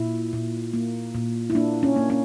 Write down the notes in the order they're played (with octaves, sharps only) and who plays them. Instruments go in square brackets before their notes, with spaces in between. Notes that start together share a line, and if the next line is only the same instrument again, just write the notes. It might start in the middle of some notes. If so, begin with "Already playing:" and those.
Already playing: [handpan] A#2 E4
A#2
A#3
A#2
E4
A#3 D4
C#4
A#3
C#4